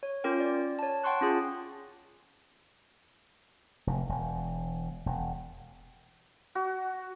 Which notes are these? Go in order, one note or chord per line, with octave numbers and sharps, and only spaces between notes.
C#5
C#4 F4 A#4 G5
D5
C#5 A5
F#5 G5 A5 C6 C#6 F#6
C#4 F4 G#4
F1
E1
E1
F#4